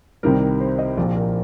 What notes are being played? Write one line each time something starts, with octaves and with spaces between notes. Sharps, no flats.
C2 C3 D#3 G3 A#4
C5
D#5
A#1 A#2 F3 D5
A#4